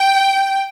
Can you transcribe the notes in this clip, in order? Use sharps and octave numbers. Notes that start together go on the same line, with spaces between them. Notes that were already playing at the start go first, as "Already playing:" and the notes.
Already playing: G5